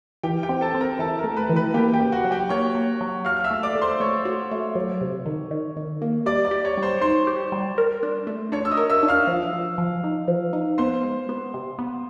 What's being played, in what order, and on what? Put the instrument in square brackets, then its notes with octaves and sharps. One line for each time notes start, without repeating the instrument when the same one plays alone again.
[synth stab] E3 [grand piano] G4 G5
[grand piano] G4 G5
[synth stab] C4
[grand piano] A4 A5
[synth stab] C4
[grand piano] A#4 A#5
[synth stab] E3 [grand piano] A4 A5
[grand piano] A#4 A#5
[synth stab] A3
[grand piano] B4 B5
[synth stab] E3
[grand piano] B4 B5
[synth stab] A#3 [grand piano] G4 G5
[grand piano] G4 G5
[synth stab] C#3
[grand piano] F#4 F#5
[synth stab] F#3
[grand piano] G4 G5
[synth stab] A#3 [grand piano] C#5 C#6
[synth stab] A#3
F#3
[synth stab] F#4 [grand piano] F5 F6
[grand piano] F6
E5 E6
[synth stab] A3
[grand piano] D5 D6
[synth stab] A3
[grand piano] C5 C6
[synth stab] A3 [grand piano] C#5 C#6
[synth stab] F#4
A3
F#3
C3
D#3
D#3
D#3
A#3
[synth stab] G3 [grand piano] D5 D6
[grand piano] D5 D6
[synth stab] G4
[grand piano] C#5 C#6
[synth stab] G3
[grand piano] C5 C6
[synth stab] D#4 [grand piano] C5 C6
[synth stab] G4
G3
A#4
D4
A3
[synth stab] D4 [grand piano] C#5 C#6
[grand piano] E6
D#5 D#6
[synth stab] A#4
[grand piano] E5 E6
[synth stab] D4
[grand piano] F5 F6
[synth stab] F3
F3
F3
D#4
F3
D#4
[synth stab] B3 [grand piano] C5 C6
[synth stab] G#3
B3
C3
B3